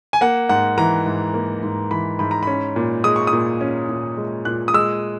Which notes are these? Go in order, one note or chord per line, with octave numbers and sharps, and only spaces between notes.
G#5
A#3 F#5
G#2 F#5
E3 A#5
G#2
A#3
G#2
E3 B5
G#2 B5
A#5
C#4 B5
A#2
G#3 D#6
C#6
D#6
A#2
C#4
A#2
G#3
A#2 F#6
D#6
G#3 E6